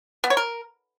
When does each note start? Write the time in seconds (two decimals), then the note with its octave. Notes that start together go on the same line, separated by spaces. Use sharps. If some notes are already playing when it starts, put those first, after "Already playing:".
0.24 B3
0.30 C#5
0.37 A#4